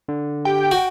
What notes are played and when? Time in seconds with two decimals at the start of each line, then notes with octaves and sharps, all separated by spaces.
0.08 D3
0.45 G4 G5
0.71 F#4